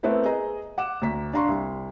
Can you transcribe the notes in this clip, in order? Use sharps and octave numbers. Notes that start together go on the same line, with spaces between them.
A3 B3 C4 E4 A#4
G#4 D#5 A#5
F#5 D6 E7
D2 A#5 B6
D4 F5 A#5 C6 C#6
C2